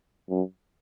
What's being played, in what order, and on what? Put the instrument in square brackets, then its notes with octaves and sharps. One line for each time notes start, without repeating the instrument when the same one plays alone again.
[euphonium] F#2